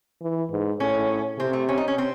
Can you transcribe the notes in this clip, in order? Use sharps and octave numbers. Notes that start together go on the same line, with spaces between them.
E3
G#2
A2 C#4
C3 C4
A3
C#4
D#4
C#4
C4